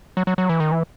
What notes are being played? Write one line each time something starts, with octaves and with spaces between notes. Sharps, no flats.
F#3
F#3
F#3
E3
D#3
E3